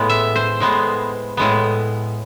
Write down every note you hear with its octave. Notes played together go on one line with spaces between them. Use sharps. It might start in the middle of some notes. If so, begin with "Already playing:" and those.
Already playing: A2 G#3 B3
E5
C5
A2 G#3 B3
A2 G#3 B3